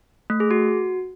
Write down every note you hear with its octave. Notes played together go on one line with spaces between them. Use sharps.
A3
G#4
F#4